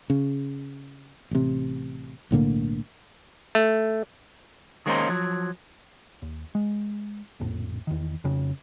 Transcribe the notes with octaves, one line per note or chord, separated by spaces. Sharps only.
C#3
A1 C3
B1 A2 D3 A#3
A3
D#3 G#3 A#3 C#4 D#4 C5
F3 F#3
D#2
G#3
A#1 F2 A2
E2 D#3
F2 C#3